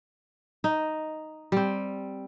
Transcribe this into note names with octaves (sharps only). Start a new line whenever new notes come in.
D#4
G3 C4